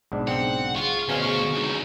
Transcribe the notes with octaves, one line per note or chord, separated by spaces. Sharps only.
B1 G#2 D4
C#3 C4 F#5
F4 G#4 C#6
D2 B2 C#4 C5 F5
G#4 C#6
C#2 D#3